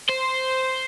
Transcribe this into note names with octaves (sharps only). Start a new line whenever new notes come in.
C5